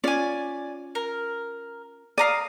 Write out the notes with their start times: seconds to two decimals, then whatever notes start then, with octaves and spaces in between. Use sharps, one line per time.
0.04 C#4 F4 D5 G#5
0.95 A#4
2.18 D5 F5 A#5 D#6